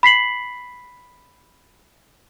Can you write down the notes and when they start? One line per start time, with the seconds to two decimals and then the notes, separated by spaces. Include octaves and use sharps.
0.03 B5 B6 C7 F#7